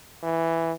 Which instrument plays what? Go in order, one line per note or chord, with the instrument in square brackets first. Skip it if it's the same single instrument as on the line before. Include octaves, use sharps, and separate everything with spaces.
[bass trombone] E3